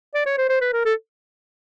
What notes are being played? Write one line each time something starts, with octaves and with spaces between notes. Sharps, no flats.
D5
C#5
C5
C5
B4
A#4
A4